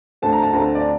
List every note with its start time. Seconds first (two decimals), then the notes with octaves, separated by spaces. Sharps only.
0.22 D2 D3 A3 C4 A5
0.32 A#5
0.43 A5
0.53 D2 D3 A3 C4 A#5
0.75 D5